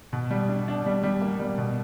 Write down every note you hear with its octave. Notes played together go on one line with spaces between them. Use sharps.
B2
G3
D4
D4
G3
G3
A#3
G3
B2